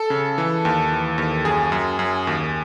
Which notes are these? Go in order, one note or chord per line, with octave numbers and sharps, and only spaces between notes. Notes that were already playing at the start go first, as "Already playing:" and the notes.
Already playing: A4
C#3
E3
D#2
E3
D#2
F#2 G#4
F#2
F#2
D#2